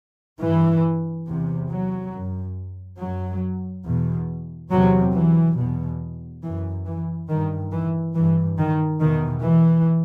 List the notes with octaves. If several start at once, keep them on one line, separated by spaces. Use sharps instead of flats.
G2 E3
E2 C3
F#3
F#2
F#2 F#3
E2 B2
E2 C3 F#3
E3
E2 B2
F#2 E3
E3
G2 D#3
E3
G2 E3
D#3
E2 B2 D#3
E3